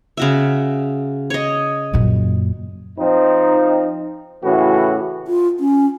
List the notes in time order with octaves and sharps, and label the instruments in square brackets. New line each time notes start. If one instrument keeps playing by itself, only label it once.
[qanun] C#3 F#4 E5
C#5 D#5
[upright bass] F#2 A#2
[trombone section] F3 C4 D#4
A2 C#3 E3 C#4 F#4
[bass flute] F4
C#4